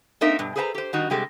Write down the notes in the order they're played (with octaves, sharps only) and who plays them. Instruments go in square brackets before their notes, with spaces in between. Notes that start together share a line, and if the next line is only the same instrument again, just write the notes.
[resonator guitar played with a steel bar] A#3 C4 D#4 A#4 E5
G2 B2
G#4 A4 B4 C5 G5 A#5
G4 C5
D#3 G3 D#4 F#4
C3 G3 G#3 G4 A4